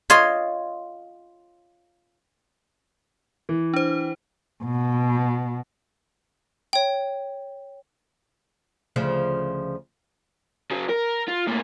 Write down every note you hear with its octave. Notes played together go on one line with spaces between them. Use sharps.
F4 C#5 D#5 C6
E3
D4 C5
B2
C#5 G5
D2 C#3 F3
C#3 F#3
A#4
F4
A2 A#3